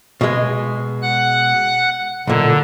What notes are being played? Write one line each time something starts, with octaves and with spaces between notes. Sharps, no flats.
B2 G#3
F#5 F#6
B1 A#2 D3